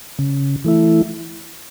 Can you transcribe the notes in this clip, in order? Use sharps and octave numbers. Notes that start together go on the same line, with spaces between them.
C#3
E3 A3 E4